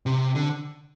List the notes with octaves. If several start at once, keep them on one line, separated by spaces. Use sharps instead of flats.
C3
D3